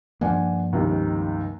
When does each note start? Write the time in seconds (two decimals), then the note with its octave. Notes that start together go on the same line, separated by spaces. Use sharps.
0.21 G2 F3 A#3 D4 F#5 G#5
0.73 C#2 C3 D#3